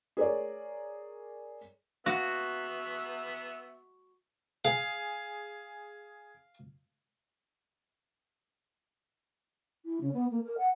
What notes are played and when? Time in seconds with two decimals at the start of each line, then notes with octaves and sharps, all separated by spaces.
0.17 G#4 A#4 C#5 D5
2.06 B3 F#4 E5
4.65 G#4 F5
9.85 E4
10.00 C#3
10.13 B3
10.30 A#3
10.44 A#4
10.57 F#5